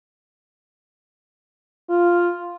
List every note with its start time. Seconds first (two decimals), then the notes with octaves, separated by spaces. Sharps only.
1.90 F4